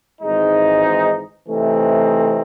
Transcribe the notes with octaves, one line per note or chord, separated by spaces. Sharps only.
G#1 G#2 E3 G#3 D#4
C3 E3 A3 C4 D#4